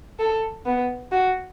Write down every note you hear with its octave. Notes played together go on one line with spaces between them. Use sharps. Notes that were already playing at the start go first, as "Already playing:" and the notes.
A4
B3
F#4